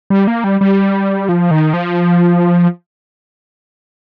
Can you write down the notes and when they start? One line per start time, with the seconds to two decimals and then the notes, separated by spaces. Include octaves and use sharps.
0.10 G3
0.27 A#3
0.44 G3
0.61 G3
1.29 F3
1.51 D#3
1.74 F3